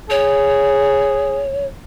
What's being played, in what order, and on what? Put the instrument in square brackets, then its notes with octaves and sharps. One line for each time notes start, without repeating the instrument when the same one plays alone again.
[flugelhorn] G#4 [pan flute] C#5